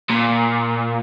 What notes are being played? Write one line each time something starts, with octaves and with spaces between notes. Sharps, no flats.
A#2